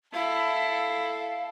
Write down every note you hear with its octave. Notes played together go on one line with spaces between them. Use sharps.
E4 A4 F5